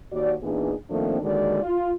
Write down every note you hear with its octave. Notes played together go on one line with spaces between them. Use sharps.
D#2 F#4 D5
A#2 E3 B3 D4 D#4 G#4
D#3 F3 A3 A#3 C4 D4
D#2 D3 D#3 G#3 F#4 D5
F4